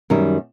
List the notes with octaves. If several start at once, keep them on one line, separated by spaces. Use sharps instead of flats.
F#2 D#3 G3